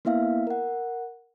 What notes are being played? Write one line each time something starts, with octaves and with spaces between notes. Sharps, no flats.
A#3 B3 E4 E5 F5
A#4 F#5